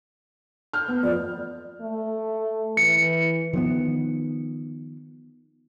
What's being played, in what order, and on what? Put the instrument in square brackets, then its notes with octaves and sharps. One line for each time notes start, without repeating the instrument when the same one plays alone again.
[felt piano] F6 G6
B3
[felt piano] F2 [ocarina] D5
[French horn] A3
[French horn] E3 [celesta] C#7
[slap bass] D#3 F3 G3 B3